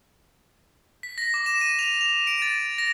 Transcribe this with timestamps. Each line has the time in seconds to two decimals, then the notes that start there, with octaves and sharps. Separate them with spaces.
1.03 B6
1.18 A#6
1.34 D6
1.46 E7
1.61 D#7
1.79 F7
2.01 F7
2.27 D7
2.42 A6
2.78 A#6